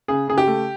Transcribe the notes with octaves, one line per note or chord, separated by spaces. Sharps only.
C#3 G#4
C#3 G#4
G4
A3